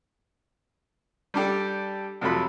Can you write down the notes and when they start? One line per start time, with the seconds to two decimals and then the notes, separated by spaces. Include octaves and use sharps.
1.34 G3 D4 G4 A4
2.21 F2 C3 F#3 A4 B5